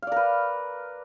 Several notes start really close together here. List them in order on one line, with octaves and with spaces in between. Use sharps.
F5 D5 A#4 B4